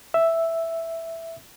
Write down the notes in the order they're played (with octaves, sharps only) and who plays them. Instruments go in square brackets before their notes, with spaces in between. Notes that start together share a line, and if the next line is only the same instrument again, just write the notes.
[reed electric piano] E5